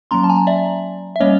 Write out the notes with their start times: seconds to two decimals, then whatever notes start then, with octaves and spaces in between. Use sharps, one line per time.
0.11 F#3 A#3 C#4 A#5 C6
0.24 A5
0.29 G#5 A#5
0.47 D5 E5
1.16 E5
1.20 G3 A#3 C#4 C#5 D#5